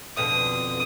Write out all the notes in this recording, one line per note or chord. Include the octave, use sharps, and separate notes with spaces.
F2 B2 D3 D#6